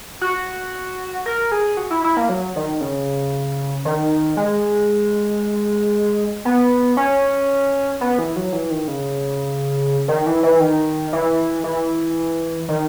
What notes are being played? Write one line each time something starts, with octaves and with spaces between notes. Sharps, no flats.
F#4
A#4
G#4
F#4
E4
E4
A#3
F#3
D#3
C#3
D#3
G#3
B3
C#4
B3
E3
F#3
E3
D#3
C#3
D#3
E3
E3
D#3
E3
E3
D#3